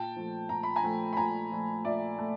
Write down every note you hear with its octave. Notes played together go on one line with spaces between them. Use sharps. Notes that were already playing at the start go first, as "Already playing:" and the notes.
Already playing: A#2 G5 A5
F3 A3
A#2 A#5
B5
G#5 A#5
F3 A3
B5
A#2 G#5 A#5
F3 A3
A#2 D5 E5
A3